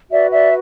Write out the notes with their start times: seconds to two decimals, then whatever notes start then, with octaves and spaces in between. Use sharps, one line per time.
0.11 F#4 B4 D5 E5
0.32 D5 E5